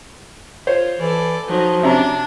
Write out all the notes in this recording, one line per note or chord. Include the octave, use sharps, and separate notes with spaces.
F4 C5 C#5
E3 A4 D5
F3 F#3 D#4
C3 C#4 D4 A#5